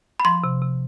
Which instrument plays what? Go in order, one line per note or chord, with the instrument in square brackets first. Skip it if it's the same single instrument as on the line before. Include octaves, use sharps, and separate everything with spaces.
[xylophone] B5
[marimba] F3 [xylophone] C6
[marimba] C3
C3